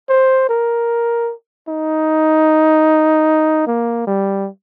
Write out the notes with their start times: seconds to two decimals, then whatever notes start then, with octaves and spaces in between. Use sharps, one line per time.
0.09 C5
0.49 A#4
1.68 D#4
3.67 A#3
4.07 G3